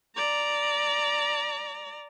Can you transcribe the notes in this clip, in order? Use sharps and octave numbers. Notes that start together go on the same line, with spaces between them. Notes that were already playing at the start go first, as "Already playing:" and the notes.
D5 A#5